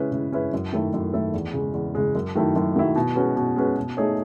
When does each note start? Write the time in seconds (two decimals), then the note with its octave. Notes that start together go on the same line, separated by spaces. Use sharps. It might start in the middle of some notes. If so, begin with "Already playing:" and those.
Already playing: C#3 G#3 C#4 E4 B4
0.12 C#3
0.32 G#3 C#4 E4 B4
0.53 F#2
0.73 D#3 A3 E4 A4
0.94 F#2
1.13 D#3 A3 E4 A4
1.33 E2
1.54 C#3 G#3
1.74 E2
1.95 C#3 G#3
2.15 F#2
2.36 D#3 F#3 A3 E4
2.56 F#2
2.76 D#3 F#3 A3 E4
2.96 B2
3.15 G#3 C#4 F#4 B4
3.37 B2
3.56 G#3 C#4 F#4 B4
3.77 B2
3.97 A3 D#4 G#4 C#5